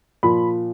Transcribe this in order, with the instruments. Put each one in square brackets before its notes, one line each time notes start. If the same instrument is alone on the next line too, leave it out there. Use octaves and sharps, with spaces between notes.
[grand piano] A#2 F3 B5